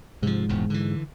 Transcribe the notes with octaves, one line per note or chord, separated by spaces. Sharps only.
G#2 C3 F3
E1 E2 A#2
D3 E3